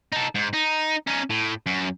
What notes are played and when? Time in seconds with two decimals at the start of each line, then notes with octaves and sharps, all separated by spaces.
0.12 D#4 A4
0.35 G#2
0.54 D#4
1.07 C#4 D#4
1.30 A2
1.66 F#2